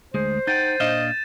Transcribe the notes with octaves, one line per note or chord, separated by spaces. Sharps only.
D2 G#3 G#4 C5
D#4 F#5 G5 G6 A6 D#7
A#2 D4 D#5 F5 E7